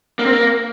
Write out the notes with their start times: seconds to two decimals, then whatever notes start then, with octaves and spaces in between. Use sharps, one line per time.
0.19 A#3
0.26 C4
0.32 A#3